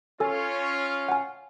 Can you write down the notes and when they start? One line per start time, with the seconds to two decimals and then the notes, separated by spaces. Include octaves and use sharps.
0.20 C#4 F4 A4 G#5
1.09 F#5 G#5